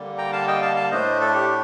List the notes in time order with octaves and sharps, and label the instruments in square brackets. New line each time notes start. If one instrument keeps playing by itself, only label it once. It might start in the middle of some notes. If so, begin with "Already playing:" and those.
Already playing: [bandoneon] D3 G3 A#3
G5 A#5
F5 A5
D#5 G5
F5 A5
F5 A5
A2 A3 D4 C5 D#5
A4
G4